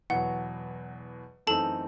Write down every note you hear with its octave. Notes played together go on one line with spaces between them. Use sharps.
E2 B2 F#3 F#5
F#2 E3 A3 C4 D#4 A4 A5